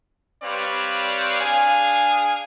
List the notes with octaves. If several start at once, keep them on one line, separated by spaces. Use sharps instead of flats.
G3 C4 B4 C#5 D5 F5
D4 G#4 F5 G#5